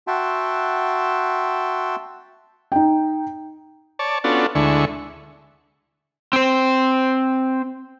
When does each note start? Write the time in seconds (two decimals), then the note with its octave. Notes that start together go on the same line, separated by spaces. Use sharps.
0.07 F#4 E5 F#5 G5 A5 C6
2.72 D#4 G5
3.99 C#5 D5 A5
4.24 B3 C#4 D4 F4 F#4 A4
4.55 D2 D3 G#3 E4 C#6
6.33 C4 C5